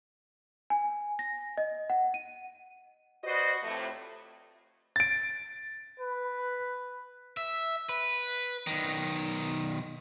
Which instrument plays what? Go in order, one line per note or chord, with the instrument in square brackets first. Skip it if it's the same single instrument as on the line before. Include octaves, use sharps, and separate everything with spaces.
[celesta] G#5
A#6
D#5
F#5
D#7
[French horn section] F#4 B4 C5 D5 D#5
F2 A2 C3 F3 A3
[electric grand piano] A6 D7
[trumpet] B4
[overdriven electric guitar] E5
B4
B1 D#3